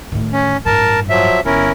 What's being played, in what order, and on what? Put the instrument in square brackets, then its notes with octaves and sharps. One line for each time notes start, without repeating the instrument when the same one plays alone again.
[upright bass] A2 D#3
[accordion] C#4
[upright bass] A1 G2 [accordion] A#4 A5
[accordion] F3 F#3 E5
[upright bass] G1 [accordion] C#4 E4 A#4